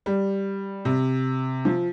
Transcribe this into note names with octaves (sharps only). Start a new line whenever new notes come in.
G3
C3
F3